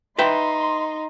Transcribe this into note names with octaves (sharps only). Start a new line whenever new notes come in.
D#4 B4 E5 G5 C6